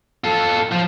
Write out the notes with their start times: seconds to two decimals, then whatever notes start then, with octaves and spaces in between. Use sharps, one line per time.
0.24 F4 A4
0.72 F3